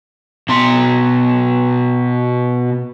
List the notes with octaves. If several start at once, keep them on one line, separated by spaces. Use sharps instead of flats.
B2 C6